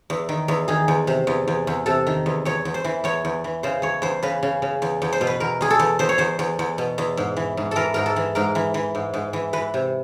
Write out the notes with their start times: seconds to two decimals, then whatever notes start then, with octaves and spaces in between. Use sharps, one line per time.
0.10 E2
0.29 D#3
0.48 E2
0.68 D#3 G#4
0.88 E2
1.07 C3
1.27 E2
1.48 E2
1.67 E2
1.86 C3 A4
2.07 D#3
2.26 E2
2.45 E2 C#5
2.65 E2
2.74 C5
2.84 E3
3.04 E2 C#5
3.25 E2
3.44 E3
3.63 C#3 C5
3.82 E2 C#5
4.02 E2 C5
4.23 C#3 B4
4.43 C#3
4.62 C#3
4.82 E2
5.02 E2
5.13 C5
5.21 B2
5.27 B4
5.40 E2 A#4
5.61 E2 G#4
5.70 A4
5.79 E2
5.99 E2 C5
6.09 C#5
6.18 E2 C5
6.39 E2
6.59 E2
6.78 B2
6.98 E2
7.17 G#2
7.37 E3
7.57 G#2
7.71 E3 A4 A#4
7.94 G#2 A#4
8.06 A4
8.16 E3
8.35 G#2 A#4
8.55 E3
8.74 E3
8.95 G#2
9.14 G#2
9.33 E3
9.53 E3 B4
9.74 C3